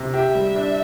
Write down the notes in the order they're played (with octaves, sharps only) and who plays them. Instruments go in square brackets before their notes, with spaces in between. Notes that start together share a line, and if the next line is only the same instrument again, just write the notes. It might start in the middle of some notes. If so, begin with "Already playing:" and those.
Already playing: [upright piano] C3
[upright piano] G4 [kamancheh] E5
[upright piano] G3
D4